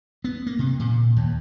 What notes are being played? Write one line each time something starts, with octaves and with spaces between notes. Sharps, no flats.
B3
A#3
C3
A#2
D#2